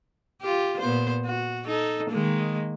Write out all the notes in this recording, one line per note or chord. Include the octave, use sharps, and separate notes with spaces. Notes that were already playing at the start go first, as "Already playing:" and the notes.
F4 G4
A#2 B3 C5
F#4
D#4 A4
D#3 G#3 A#3